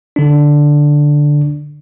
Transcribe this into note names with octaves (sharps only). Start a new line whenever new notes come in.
D3 D4